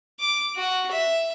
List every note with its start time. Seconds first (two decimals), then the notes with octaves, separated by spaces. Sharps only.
0.20 D6
0.55 F#4
0.91 E5